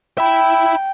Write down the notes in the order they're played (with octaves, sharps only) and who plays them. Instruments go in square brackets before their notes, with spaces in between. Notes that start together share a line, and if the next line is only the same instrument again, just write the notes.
[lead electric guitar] E5 B5 [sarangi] G5